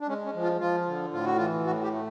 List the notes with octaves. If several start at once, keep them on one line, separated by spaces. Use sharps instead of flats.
D4
G#3 C#4
C#4
F3
F4
F3 F4
D3
A2 F4
F#4
E3 F4
A2 F#4
G4
A3